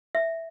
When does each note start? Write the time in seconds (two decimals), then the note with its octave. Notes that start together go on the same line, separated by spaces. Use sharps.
0.15 E5